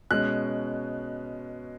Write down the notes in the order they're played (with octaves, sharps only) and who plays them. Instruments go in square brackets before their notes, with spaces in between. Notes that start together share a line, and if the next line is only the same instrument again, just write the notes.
[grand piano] B2 G#3 C#4 F#6